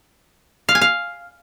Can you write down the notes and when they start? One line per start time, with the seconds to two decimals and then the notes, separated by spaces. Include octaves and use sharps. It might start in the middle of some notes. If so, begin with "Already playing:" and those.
0.69 F5
0.75 G#5
0.81 F5